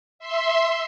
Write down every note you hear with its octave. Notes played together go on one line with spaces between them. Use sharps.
E5 C6